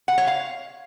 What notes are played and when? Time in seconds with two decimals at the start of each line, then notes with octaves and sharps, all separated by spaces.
0.08 F#5
0.18 C#5
0.27 F5